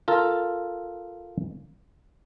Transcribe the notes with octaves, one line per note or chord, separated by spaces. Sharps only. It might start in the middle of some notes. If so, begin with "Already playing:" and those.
F4 A4 A#4